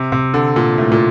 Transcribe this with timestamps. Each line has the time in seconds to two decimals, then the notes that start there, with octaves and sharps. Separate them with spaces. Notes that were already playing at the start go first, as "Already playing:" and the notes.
Already playing: C3
0.12 C3
0.34 D3
0.56 A#2
0.78 A2
0.92 A#2